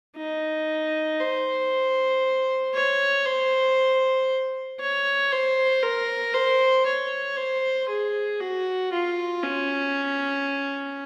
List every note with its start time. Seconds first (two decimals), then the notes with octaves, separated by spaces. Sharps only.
0.17 D#4
1.20 C5
2.75 C#5
3.25 C5
4.80 C#5
5.32 C5
5.83 A#4
6.34 C5
6.86 C#5
7.37 C5
7.89 G#4
8.40 F#4
8.92 F4
9.43 C#4